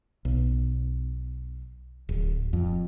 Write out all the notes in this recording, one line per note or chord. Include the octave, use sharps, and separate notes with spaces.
B1
D1
F2